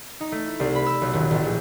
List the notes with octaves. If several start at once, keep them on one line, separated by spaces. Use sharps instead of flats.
D#4
A3
E4
C2
B5
E6
B1
D#1
A1
A#1